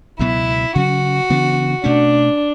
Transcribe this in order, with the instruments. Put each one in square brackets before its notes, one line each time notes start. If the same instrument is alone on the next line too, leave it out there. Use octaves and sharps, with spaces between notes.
[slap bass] C#2 B2 F#3 B3 [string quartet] E4
[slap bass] C#3 F#3 C#4 [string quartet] F#4
[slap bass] C#3 E3 B3 D4
[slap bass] B2 A3 C#4 [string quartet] D4